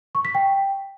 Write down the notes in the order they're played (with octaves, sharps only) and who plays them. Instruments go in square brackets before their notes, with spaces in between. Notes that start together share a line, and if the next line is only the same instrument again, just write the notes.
[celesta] C#6
B6
G5